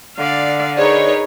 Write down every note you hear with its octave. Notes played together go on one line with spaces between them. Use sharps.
D3 D5 F5
D#4 G#4 A#4 B4 C#5 D5